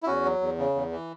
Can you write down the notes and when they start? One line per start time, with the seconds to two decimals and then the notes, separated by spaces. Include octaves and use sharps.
0.03 E4
0.07 E2 C#4 F#4
0.25 F#3
0.41 E2
0.58 C#3
0.75 E2
0.91 E3